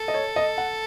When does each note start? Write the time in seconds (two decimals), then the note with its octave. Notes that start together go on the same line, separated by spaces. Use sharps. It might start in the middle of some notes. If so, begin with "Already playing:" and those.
Already playing: A4
0.08 D#5
0.14 C#5
0.36 D#5
0.58 F#5